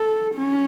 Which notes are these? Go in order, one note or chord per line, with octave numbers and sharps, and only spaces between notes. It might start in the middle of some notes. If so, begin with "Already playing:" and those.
Already playing: A4
C#4